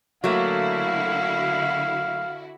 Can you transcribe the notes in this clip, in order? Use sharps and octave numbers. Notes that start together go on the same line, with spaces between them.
D3 F#3 A3 A#3 E4 F#4 F5